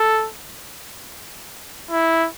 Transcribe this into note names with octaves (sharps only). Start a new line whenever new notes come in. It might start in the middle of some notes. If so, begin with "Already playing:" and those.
Already playing: A4
E4